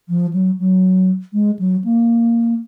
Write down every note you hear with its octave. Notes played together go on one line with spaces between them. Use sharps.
F3
F#3
F#3
G#3
F#3
A#3